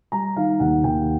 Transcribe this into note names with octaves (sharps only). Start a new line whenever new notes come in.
G3 A#5
D#3 F5
D#2 F#5
D#2 G5